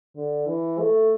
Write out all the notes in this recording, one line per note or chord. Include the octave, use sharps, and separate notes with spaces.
D3
E3
A3